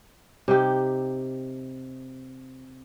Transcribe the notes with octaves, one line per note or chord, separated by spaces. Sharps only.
C3 D#4 G4